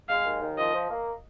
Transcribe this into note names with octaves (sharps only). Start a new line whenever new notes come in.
G#3 F5
D#2
D#3
F3 D#5
F3
A#3